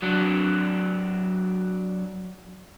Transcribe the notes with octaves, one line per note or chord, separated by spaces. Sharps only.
F#3 D4